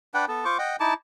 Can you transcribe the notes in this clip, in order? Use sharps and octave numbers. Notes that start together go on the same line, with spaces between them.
D4 B4 F#5 G5
B3 A4
F4 C5 C#6 D6
D#5 F#5 G5
D#4 E4 A5 D6